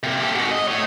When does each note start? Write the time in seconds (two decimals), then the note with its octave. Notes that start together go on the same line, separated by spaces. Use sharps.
0.03 C3 A#3
0.21 G4 A4
0.35 G#2 F#4
0.51 D#5
0.68 A3 C#5